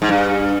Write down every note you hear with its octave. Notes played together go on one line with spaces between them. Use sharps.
G#2
G2